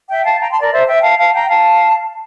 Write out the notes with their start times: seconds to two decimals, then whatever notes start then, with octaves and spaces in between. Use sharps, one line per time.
0.09 E5 G5
0.25 F5 A5
0.40 G5 A#5
0.51 A5 C6
0.61 A#4 D5
0.72 C5 E5
0.87 E5 G5
1.02 F5 A5
1.18 F5 A5
1.33 G5 A#5
1.49 F5 A5